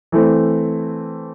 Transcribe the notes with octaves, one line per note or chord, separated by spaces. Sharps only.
E3 A3 C4